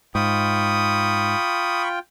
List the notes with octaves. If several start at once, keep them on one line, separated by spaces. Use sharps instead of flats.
G#2 F4 G5 B5 C#6 D#6